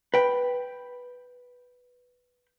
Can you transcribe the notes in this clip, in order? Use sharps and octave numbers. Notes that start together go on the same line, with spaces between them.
B4 G5 B5